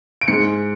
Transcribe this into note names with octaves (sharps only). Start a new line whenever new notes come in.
D7
G#2 G#3 C#7